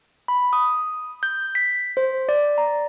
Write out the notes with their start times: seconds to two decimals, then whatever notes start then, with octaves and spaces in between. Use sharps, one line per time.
0.28 B5
0.53 D#6
1.23 G6
1.55 B6
1.97 C5
2.29 D5
2.58 A#5